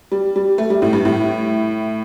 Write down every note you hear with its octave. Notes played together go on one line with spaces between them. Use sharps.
G3
G3
A3
G3
A2
G2
A2